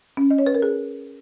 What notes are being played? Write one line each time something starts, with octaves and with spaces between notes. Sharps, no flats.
C#4
D#5
C#5
B4
A#4
G#4